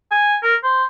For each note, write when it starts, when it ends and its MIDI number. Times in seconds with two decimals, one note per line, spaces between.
0.11 0.37 80
0.43 0.55 70
0.63 0.84 72